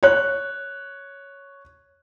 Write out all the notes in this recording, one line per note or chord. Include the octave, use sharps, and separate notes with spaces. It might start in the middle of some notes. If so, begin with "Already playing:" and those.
C#5 F#6